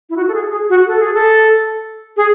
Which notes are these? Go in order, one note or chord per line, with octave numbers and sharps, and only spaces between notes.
E4
F#4
A4
G#4
G#4
F#4
A4
G#4
A4
G#4